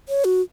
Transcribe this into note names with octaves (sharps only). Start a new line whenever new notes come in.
C#5
F#4